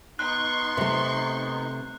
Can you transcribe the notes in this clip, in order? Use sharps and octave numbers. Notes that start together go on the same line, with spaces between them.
B3 D#4 C6 C#6 F#6
C3 A3